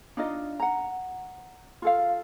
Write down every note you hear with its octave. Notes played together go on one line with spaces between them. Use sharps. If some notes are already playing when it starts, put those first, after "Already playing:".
D4 D#4 F4 D#5
F#5 A#5
F4 A4 F5